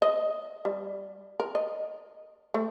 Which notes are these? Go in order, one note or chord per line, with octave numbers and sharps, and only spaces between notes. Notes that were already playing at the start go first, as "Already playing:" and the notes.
D#5
G3
A#4
D#5
A3